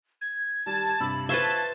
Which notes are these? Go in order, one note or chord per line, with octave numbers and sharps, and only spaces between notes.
G#6
D#3 G3 A5
G2 C3 B5 E6
F4 B4 C5 E5 A5 C#6 G#6 C7